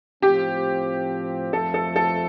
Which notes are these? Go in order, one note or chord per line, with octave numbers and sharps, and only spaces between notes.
A2 F3 C4 G4
F2 F3 A3 A4
A4
A4